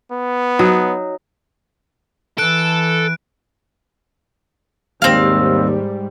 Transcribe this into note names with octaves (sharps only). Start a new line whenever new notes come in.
B3
F#3 D#4
E3 A4 F#6 D7
D#2 G#2 G3 C4 F5